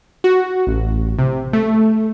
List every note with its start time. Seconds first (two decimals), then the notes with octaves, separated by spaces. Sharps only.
0.24 F#4
0.67 A1
1.18 C3
1.53 A3